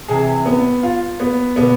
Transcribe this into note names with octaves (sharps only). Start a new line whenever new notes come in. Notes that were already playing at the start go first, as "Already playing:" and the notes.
C3 E3 G#4
B3
F4
B3
B2 D3 B3